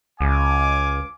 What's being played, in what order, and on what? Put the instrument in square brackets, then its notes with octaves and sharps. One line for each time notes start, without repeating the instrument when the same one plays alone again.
[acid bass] C#2 [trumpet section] F5 G#5 D6